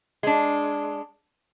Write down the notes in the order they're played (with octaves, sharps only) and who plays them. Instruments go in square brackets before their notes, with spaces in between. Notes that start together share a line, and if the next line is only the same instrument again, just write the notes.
[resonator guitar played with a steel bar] G#3 D4